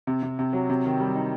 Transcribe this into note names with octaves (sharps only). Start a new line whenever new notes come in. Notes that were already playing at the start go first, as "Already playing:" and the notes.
C3
C3
C3
F#3
C3
D#3
G3
D#4